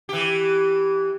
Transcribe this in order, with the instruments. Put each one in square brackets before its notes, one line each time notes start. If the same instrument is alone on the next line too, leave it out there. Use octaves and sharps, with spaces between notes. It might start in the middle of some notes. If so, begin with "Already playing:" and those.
[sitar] E3 G4